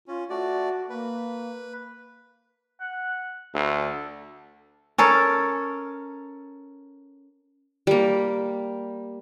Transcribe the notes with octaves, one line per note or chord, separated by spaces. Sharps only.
C#4 F4
A3 F#4 D5
A#3 B4
F#5
D2 A4
C#4 A4 A#4 C#5
G3 A#3